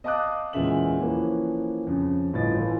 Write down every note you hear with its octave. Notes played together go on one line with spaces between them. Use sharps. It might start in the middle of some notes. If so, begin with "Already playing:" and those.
D#5 F5 A5 D6 D#6 F#6
E2 A#2 C#3 G#3 E5 F#7
E3 F3 A#3 C#4
F2 C#3
G1 A2 F4 D#5 A6
E3 F4 A4